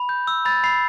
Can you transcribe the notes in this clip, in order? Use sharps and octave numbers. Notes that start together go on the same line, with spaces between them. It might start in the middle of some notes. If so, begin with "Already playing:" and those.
Already playing: B5
G6
E6
B5 A6
B5 C7